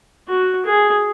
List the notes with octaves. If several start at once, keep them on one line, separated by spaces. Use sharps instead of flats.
F#4
G#4